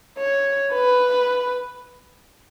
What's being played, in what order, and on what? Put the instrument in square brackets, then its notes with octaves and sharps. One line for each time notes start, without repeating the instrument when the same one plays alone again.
[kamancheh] C#5
B4